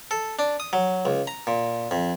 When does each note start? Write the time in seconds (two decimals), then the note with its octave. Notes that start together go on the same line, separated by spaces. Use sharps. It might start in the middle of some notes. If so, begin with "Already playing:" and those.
0.11 A4
0.39 D4
0.60 D#6
0.73 F#3
1.05 C#2
1.27 A#5
1.47 A#2
1.91 F2